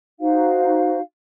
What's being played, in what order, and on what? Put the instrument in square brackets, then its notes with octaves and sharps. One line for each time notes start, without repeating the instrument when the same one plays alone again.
[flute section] D#4 F#4 C5 F5